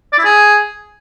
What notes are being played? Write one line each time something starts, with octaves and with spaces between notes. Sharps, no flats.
D5
E4
G#4